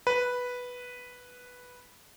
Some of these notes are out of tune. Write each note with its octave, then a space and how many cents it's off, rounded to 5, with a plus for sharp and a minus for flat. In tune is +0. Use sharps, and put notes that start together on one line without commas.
B4 -5